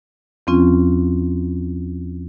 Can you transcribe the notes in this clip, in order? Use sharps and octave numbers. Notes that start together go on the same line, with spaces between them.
E2 F3 C4 C#4 F4